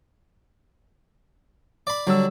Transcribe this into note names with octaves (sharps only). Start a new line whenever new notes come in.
D5 B5
D3 F#3 G3 E6